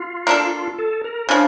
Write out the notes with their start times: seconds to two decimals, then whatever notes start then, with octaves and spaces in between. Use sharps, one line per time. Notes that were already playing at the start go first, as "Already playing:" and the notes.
Already playing: F4
0.27 A#3 D4 A4
0.79 A4
1.04 A#4
1.29 C#3 F3 D4